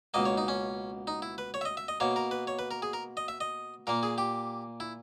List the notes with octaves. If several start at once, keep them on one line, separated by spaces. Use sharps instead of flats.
C#2 B2 A#3 D#5
C#5
D#4
C#4
D#4
E4
B4
C#5
E5
D#5
E5
D#5
B2 A#3 C#5
A#4
B4
C#5
B4
A#4
G#4
A#4
D#5
E5
D#5
A#2 A#3 A#4
G#4
G4
E4